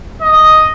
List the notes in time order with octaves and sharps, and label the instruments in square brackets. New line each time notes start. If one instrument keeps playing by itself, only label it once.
[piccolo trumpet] D#5